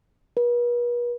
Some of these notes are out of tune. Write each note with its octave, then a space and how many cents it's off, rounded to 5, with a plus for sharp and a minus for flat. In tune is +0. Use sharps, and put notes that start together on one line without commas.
B4 -45